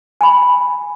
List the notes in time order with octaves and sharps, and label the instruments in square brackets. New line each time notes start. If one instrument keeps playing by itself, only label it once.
[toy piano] G#5 B5